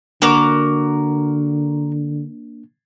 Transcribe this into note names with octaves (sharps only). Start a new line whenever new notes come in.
D3 A#3 D4 F#4 A#4 D6